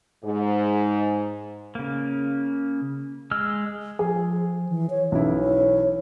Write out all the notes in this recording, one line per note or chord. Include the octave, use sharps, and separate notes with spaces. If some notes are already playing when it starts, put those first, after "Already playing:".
G#2
C#3 A#3
G#3 E6 F6
F3 G#4
E3
C#5
B1 E3 C#4 E4
C#5